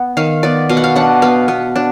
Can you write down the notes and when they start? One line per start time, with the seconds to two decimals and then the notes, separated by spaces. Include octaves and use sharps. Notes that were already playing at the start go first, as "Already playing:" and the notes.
Already playing: B3
0.17 D#3 F5
0.43 B3 D5
0.69 B2 F5
0.77 F#5
0.84 F5
0.96 D4 F#5
1.22 B3 F5
1.48 B3
1.76 D4